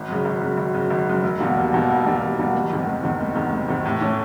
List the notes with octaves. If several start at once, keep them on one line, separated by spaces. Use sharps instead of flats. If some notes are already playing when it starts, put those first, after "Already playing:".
Already playing: G#1
F#2 C#3
G#1
F#2 C#3
G#1
F#2 C#3
G#1
F#2 C#3
E1
E2 B2 G3 A#3
E1
E2 B2 G3 A#3
E1
E2 B2 G3 A#3
E1
E2 B2 G3 A#3
F#1
E2 C3 D#3
F#1
E2 C3 D#3
F#1
E2 C3 D#3
F#1
E2 C3 D#3
A2
E3 A3 C#4